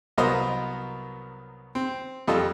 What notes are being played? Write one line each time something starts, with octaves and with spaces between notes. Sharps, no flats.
C2 F#3 B3 A#4 C5 D#5
C4
F2 G3 F4 A4 D#5